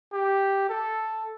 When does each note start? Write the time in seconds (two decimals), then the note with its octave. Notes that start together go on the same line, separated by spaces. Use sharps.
0.13 G4
0.69 A4